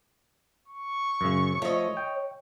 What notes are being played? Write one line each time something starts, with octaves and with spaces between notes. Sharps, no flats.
C#6
F#2 C#3
F3 A3 C#5 D#5
G5